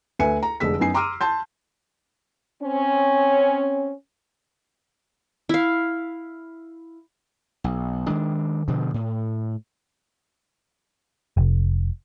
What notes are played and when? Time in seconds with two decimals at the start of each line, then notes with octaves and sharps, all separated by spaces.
0.19 D2 B4 E5 G#5 C#7
0.43 A#5
0.60 F1 D3 G#3 E6 B6
0.80 F#2 B3 D#4 G#5 C7
0.94 A#5 C6 D6 E6 F6 D#7
1.21 A5 C6 G6
2.63 C4 C#4
5.49 E4 F5
7.64 B1
8.07 D#3 G#3 D4
8.68 G2 B2 D3 F3
8.94 A2
11.37 F1